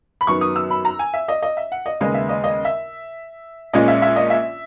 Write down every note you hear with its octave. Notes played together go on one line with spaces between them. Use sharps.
B5
F#2 D#3 F#3 B3 C#6
D#6
E6
B5
A#5
G#5
E5
D#5
D#5
E5
F#5
D#5
D#2 C#3 G#3 B3 D#5
E5
D#5
D#5
E5
A#1 A#2 G#3 C#4 D#5
E5
E5
D#5
E5